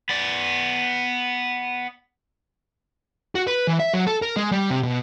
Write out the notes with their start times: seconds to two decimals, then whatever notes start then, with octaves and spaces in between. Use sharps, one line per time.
0.09 B3 D5
3.35 F#4
3.47 B4
3.67 E3
3.80 E5
3.94 F#3
4.07 A4
4.22 A#4
4.37 G#3
4.52 G3
4.70 C3
4.83 B2